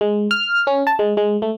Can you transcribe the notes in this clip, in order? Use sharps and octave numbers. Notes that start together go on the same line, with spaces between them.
G#3
F6
C#4
A5
G#3
G#3
A3